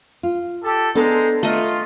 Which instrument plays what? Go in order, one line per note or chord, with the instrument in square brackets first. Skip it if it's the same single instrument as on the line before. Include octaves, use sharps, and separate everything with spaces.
[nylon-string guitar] F4
[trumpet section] G4 A4
[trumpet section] G#3 C5 A#5 [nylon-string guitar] B3 D4 A4
[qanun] A3 D#5 [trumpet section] F4